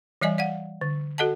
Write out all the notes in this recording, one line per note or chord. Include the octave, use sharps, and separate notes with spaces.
E3 G3 D5 D#5 G#5
D5 F5 F#5
D3
F#4 A4 D#5 F#5 A5